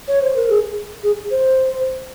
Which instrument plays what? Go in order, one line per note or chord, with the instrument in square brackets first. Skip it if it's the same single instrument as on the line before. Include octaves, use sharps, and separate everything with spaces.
[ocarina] C#5
C5
A#4
G#4
G#4
C5